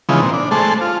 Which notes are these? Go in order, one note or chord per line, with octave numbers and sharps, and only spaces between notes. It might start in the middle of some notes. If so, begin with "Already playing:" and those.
C#3 E3 F3 G#3 B3 D#4
A#2 C4
D4
G#3 A3 A4 C5
F4